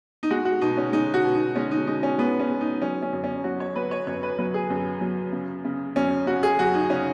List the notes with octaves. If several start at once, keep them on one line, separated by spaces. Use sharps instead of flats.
D#4
G#3 F#4
F#4
B2 D#4
C#4
G#3 D#4
F#4
B2
D#4
G#3 C#4
D#4
G#3 D#4
C#4
G#3 B3
C#4
G#3
D#4
F#3 C#4
C#4
F#2
C#4
F#3 F#4
C#5
F#3 B4
C#5
F#2 C#5
B4
F#3 B4
G#4
F#2
F#3
C#3
C#3
F#2 C#4
C#3 F#4
G#4
F#2 F#4
D#4
C#3 C#4